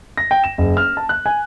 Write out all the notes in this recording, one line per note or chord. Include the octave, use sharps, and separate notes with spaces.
A#6
G5
E7
F#1
F6
A5
F#6
G#5